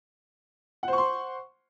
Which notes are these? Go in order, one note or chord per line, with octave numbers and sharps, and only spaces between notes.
C5 F#5 C6 C#6